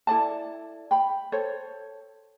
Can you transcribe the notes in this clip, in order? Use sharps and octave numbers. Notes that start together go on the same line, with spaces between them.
E4 A4 D5 A5
G5 B5
A4 C5 C#5